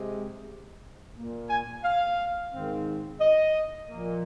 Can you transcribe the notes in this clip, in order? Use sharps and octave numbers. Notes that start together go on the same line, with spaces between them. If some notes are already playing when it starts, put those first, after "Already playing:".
Already playing: C3 G#3
A#2 A#3
G#5
F5
G#2 D#3 C4
D#5
A#2 F3 A#3